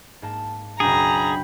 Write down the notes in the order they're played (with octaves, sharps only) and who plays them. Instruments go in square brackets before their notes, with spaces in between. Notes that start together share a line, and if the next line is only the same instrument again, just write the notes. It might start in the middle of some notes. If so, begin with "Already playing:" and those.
[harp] G#2 A#3 A5
[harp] F#1 B1 D4 [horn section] F#2 G5 B5 [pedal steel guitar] G#4 [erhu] A#5